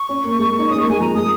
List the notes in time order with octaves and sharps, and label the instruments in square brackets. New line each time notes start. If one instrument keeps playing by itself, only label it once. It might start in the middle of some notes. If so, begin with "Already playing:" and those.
Already playing: [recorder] C#6
[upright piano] C#4
A#3
G#3
A#3
D#4
[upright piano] C#4 [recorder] D#6
[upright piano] G#3
[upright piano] A#3 [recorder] C#6
[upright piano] G#3 [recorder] G#5
[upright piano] F3 [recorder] A#5
[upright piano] G#3 [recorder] D#6